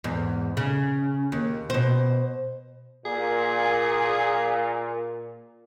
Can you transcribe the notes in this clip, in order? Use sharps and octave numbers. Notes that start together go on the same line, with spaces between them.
E2 G#2
C#3
D#2
B2 C5
A#2 G#4